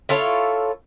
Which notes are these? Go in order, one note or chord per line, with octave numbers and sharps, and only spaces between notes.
E4 F4 A4 C#5